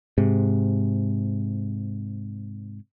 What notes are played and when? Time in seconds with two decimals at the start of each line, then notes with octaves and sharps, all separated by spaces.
0.18 G#2 C3